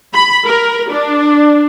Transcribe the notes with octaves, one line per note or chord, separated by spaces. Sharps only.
B5
A#4
D4